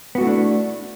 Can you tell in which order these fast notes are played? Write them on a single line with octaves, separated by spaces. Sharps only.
B3 F#4 A3 E4 D4